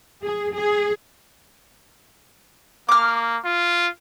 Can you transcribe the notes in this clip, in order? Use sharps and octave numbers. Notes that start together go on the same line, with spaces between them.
G#4
G#4
A#3 D6 F6
F4